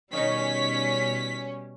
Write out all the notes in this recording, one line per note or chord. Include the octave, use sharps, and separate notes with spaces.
B2 D#3 G3 C#4 D#4 B6